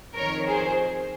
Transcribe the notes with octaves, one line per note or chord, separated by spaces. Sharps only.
F2 D#3 A#4 C#5
G#4 C5